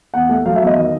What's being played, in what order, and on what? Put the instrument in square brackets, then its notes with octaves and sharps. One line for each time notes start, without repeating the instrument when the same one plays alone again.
[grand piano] E2 F#5
A3
F#3 F5
E5
E2
D#5
D#3